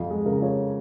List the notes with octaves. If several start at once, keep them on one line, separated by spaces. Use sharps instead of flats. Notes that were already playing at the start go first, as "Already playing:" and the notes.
Already playing: F2 F3 F4
G#3 G#4
C#3 A#4
F3 C#5